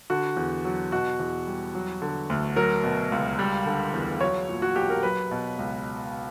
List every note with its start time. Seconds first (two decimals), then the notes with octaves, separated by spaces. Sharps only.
0.10 D3 F#4
0.37 E2
0.65 F#3
0.92 B2 F#4
1.19 E2
1.47 G3
1.75 F#3
2.02 D3
2.30 D2
2.56 F#3 A#4
2.83 B2
3.12 C#2
3.39 G3
3.66 D3
3.94 E2
4.21 F#3 C#5
4.49 A#2
4.62 F#4
4.76 B1 G4
4.90 A#4
5.03 F#3 B4
5.31 B2
5.59 C#2